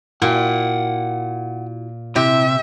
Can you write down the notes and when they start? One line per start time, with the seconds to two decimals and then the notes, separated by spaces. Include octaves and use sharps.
0.22 A#2 E4 F#4 F#5 G5
2.16 C3 E4 G4 E5